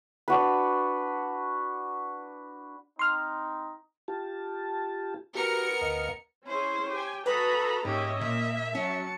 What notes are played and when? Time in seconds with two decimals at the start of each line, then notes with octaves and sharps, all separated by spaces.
0.28 D4 F#4 B4
2.99 C4 D#4 C6 F6
4.08 F4 G4 A5
5.35 B3 F#4 G4 A#4 C#7
5.81 D2 D#5 F5
6.47 C#4 E4 G#4 C5
6.88 G4 G5 G#5
7.26 F#4 A4 B4 G#5 A#5 B5 D#6
7.85 G#2 A#3 C#4 G4 D#5 E5
8.21 A#2 A#3 E5
8.75 F#3 C#4 A5 C#7